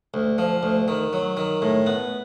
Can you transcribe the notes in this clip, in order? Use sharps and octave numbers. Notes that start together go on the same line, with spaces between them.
D2
F3
D2
D#3
F#3
D#3
A2
B3